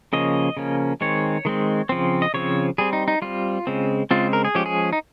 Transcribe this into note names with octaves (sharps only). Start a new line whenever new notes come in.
C#3 F3 A#3 C#4 D#5
C#3 F3 A#3 C#4
D#3 G#3 C4 C#5
D#3 G#3 C4
C#3 F3 C4
D#5
C#3 F3 C4 C#5
G3 C4 G#4
D#4
D#4
G3 C4 F4
C#3 G#3 C4
C#3 G#3 C4 F4
A#4
G#4
F3 G#3 C#4 G4
G#4
D#4